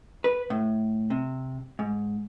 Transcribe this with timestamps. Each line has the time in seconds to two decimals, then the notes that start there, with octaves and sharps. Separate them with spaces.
0.24 B4
0.50 A2
1.10 C3
1.79 G#2